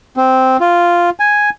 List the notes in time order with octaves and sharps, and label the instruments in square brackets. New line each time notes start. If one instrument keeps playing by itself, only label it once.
[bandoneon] C4
F4
G#5